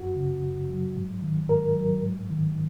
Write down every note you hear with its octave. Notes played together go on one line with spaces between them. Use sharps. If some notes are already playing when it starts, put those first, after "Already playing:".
Already playing: F#2 F#4
C#3
F#2
F#3
G#2
D#3
G#2 A#4
F#3
G#2
D#3